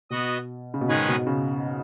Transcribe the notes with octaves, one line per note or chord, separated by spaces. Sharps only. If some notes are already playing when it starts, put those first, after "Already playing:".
B2 B3 F#4 D#5
C#3
B2
G#2 D#3 G#3 C#4 G#4 B4
B2
C#3